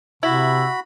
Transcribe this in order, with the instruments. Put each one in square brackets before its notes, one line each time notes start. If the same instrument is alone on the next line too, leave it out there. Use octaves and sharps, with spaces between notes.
[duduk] C3 [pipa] E4 [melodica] F#4 B5